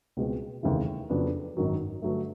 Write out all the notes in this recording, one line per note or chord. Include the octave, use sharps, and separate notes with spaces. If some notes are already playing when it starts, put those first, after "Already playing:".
C#2 B2 G#3 C4
F1 D#2 C#3 E3 A3
F2 C#3 F#3 B3 D4
G#1 F#2 D#3 F#3
G2 D3 F#3 A3